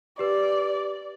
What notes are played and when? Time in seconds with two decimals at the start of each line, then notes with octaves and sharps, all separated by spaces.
0.19 G4 B4 D5